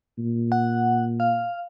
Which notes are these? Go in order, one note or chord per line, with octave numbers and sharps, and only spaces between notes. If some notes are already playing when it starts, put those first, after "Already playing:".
A#2
F#5
F5